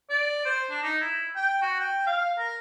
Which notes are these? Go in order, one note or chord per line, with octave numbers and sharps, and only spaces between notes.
D5
C5
D4
D#4
E4
G5
F#4
G5
F5
A#4